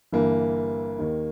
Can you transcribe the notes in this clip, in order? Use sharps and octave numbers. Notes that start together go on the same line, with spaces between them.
G1 G2 E3 A#3
D#2 D#3